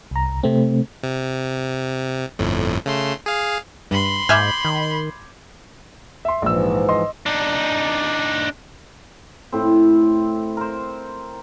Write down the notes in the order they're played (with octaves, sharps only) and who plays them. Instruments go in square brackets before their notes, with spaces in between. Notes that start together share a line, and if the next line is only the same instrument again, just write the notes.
[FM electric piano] C2 A#5
C3 A3 C4
[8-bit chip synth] C3
G1 F2 A2
C#3 A3 C6
G#4 F5
[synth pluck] G2 [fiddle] B5 C6
[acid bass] G#2 [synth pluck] E5 G#5 F6 [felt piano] D6 G6 G#6
[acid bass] D#3
[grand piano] E5 C6
[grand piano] A#1 E6 [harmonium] G#2 E3 F3
[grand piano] D#5 C6
[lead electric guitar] D4 D#4
[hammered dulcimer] A2 C4
A#4 C5